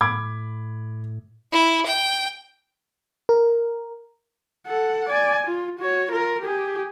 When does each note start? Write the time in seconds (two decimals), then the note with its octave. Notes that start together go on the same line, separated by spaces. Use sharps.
0.01 A2 B5 D6 G#6
1.52 E4
1.87 G5
3.29 A#4
4.67 A4 F#5
5.09 D5 G#5
5.47 F4
5.79 F#4 C#5
6.11 F4 A#4
6.42 G4 G#4